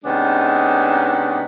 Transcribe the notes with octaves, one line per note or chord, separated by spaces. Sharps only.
C3 D#3 G#3 B3 C#4 D4